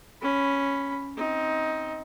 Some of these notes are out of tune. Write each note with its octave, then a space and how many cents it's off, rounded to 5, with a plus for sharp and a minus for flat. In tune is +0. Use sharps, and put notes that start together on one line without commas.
C#4 +0 B5 +0
C4 +0 D#4 +15